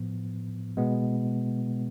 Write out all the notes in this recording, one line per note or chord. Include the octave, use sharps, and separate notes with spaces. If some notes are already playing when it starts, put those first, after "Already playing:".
Already playing: A2 F3 B3
B2 G#3 B3